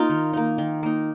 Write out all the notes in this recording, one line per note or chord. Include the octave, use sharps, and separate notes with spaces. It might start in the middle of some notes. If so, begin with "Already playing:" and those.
Already playing: A#3 D#4 F4 A#4
D#3
A#3 D#4
D#3
A#3 D#4